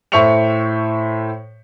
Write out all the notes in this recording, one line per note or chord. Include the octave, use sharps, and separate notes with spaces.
A2 C5 E5 C#6 C#7 F7